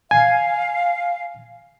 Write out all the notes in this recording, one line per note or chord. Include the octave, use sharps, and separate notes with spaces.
F5 G#5